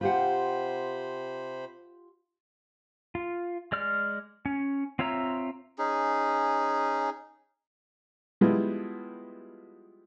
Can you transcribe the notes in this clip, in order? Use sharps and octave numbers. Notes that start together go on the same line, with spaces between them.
C3 F4 G4 C5 F#5 B5
F4
G#3 D5 F6
C#4
C4 F4 C#5 E5 A#5
C#4 D#4 G#4
F3 G3 G#3 B3 E4 F4